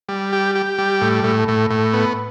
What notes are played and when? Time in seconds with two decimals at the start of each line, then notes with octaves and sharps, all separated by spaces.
0.09 G3
0.33 G4
0.55 G4
0.78 G3
1.01 A2
1.24 A2
1.48 A2
1.70 A2
1.93 B3